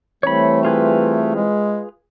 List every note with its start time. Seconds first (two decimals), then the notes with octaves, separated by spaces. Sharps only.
0.23 E3 G3 A3 C4 C#5 B5
0.65 F4 G#4 B4
1.35 G#3